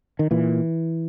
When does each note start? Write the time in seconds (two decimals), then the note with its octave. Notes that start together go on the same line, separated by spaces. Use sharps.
0.19 D#3
0.31 A#2 E3